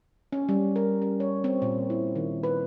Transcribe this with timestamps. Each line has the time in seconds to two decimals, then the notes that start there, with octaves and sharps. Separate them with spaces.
0.32 C#4
0.49 G3
0.76 A#4
1.02 C#4
1.20 C#5
1.44 C4
1.62 A#2
1.90 E4
2.16 D#3
2.43 B4